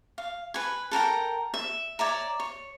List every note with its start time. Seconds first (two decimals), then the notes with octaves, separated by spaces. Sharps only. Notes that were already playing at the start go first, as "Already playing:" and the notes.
0.18 F5
0.54 B4 G#5
0.91 A4 A#4 G5 A#5
1.54 E5
1.99 C#5 D5 E5 A#5
2.40 C#5